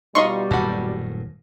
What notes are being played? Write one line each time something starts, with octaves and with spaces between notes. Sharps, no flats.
B2 G3 D#4 F4 D#5 C6 C#6
D#1 F#2 A2 F#4 A4